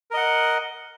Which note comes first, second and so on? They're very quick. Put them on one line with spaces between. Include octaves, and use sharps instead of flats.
A#4 D#5 F#5